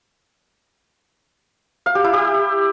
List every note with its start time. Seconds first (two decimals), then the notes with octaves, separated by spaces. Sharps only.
1.86 F5
1.95 G4
2.04 E4
2.13 G4